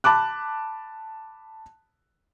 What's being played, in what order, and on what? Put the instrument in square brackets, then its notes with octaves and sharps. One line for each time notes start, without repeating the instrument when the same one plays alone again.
[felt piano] A5 B5 D6 F#6